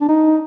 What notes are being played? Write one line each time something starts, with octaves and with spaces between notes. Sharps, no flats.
D4
D#4